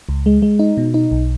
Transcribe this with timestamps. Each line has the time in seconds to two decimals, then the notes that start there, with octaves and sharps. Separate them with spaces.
0.09 C#2
0.26 G#3
0.42 G#3
0.59 D#4
0.77 B2
0.94 D#4
1.11 B1